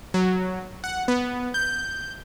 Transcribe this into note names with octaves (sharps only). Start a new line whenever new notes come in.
F#3
F#5
B3
G6